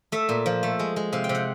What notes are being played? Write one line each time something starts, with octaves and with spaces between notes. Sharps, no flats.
A3 E5
A#2
F3
A3
G#3
G#3
C3 F5
G5
C3
F#5